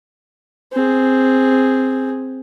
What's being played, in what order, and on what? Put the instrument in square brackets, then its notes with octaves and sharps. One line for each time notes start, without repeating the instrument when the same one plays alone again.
[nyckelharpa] C4 G#4